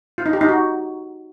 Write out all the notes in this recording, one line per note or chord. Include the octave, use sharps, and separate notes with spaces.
F4
D#4
G4
D#4
F#4